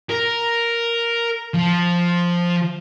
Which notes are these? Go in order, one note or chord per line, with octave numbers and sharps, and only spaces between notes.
A#4
F3